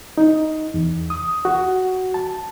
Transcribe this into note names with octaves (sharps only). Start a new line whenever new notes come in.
D#4
E2
D#6
F#4
A5